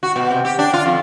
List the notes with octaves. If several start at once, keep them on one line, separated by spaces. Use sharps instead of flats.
F#4
B2
C3
G4
D4
F4
F2